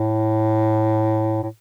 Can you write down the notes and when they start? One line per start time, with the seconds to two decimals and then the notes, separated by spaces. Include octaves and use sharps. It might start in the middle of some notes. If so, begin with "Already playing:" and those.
Already playing: A2
1.43 A2